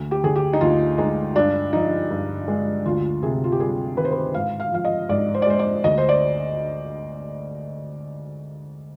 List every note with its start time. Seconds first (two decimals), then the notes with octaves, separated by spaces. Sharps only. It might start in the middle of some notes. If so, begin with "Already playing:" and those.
Already playing: D2
0.11 G4
0.24 D3 G#4
0.36 G4
0.53 D#4
0.61 D2 F4
0.98 G#3 D#4
1.36 G2 D4
1.73 F3 D#4
2.10 G2
2.48 G#3
2.85 D2 F4
3.22 C3 G#4
3.44 F4
3.52 G4
3.60 G3 G#4
3.97 D#3 B4
4.05 C5
4.12 B4
4.34 G#2 F5
4.60 F5
4.72 F3 F5
4.85 D#5
5.09 G#2 D5
5.34 C5
5.42 D5
5.47 G#3 C5
5.59 D5
5.84 D2 D#5
5.98 C5
6.09 D5